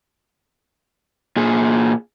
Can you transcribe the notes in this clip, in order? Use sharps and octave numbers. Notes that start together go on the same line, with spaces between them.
A#2 G#4